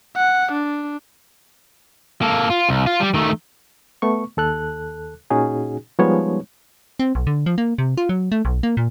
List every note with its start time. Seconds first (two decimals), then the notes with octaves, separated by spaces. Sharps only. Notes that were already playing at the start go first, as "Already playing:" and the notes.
0.16 F#5
0.52 D4
2.22 A#3 A4
2.50 F4
2.69 C2
2.86 F4
3.00 G3
3.14 D#3 A3
4.02 A3 B3 C#6
4.37 D#2 A4 F#6
5.30 A#2 C#4 D#4 F#4 G#4
5.99 F3 G3 G#3 B3 D#4 C#5
6.99 C4
7.15 B1
7.27 D3
7.46 F3
7.58 A#3
7.78 C3
7.98 F4
8.09 F#3
8.32 A3
8.45 B1
8.63 A#3
8.77 A#2